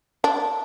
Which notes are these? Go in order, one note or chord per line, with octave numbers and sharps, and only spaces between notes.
D4